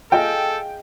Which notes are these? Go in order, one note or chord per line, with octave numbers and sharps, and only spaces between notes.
F4 G#4 A4 D#5 G5